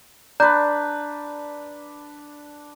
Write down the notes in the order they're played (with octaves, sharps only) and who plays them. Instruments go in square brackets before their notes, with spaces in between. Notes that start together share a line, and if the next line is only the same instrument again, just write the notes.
[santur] D4 B4 [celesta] D5 A#5 G6